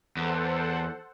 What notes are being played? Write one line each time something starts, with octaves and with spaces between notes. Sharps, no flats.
E2 A4 C5 F#5